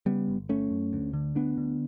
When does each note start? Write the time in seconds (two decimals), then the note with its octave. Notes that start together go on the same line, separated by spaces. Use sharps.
0.06 C#3 G3 B3
0.28 G1
0.49 G1 A3 C#4
0.71 F#2
0.93 D2
1.13 D3
1.35 D2 B3 D4
1.58 D3